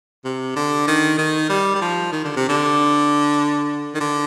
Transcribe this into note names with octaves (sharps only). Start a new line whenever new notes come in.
C3
D3
D#3
D#3
G3
G3
F3
D#3
D3
C3
D3
D#3
D3